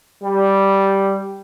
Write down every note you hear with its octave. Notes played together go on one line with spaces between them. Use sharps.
G3